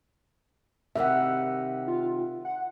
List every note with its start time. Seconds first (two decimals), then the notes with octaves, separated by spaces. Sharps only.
0.96 C3 D#3 G3 E5 F#5
1.88 F4
2.45 F#5